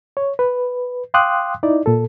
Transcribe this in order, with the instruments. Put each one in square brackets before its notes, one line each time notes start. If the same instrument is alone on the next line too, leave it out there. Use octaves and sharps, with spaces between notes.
[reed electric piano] C#5
B4
F5 G5 C6 D6 D#6 F#6
D#4 E4 D5
A#2 A4